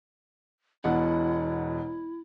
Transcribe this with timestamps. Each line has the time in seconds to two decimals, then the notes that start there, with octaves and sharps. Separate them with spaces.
0.84 E1 B2 E4 F#5